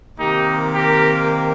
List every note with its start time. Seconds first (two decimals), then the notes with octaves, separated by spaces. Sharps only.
0.17 C3 D#3 A#3 D#4 G4
0.74 G4 A#4